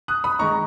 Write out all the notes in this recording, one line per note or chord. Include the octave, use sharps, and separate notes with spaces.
D#6 F#6
B5 D#6
D#3 G#3 D#4 A#5 C#6